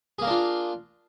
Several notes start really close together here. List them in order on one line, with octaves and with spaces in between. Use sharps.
G#4 A#3 A#4 D4 F4